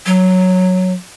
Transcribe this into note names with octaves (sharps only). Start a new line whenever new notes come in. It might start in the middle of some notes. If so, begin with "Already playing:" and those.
F#3